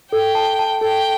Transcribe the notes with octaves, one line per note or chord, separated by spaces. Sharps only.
A4 G5
A5
A5
A4 G5